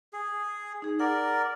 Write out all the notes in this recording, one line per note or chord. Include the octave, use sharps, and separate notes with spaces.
G#4
D#4 G#4
A#4 D5 F#5